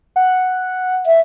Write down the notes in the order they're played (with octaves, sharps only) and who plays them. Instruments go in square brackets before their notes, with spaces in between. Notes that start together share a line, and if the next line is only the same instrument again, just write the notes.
[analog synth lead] F#5
[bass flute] E5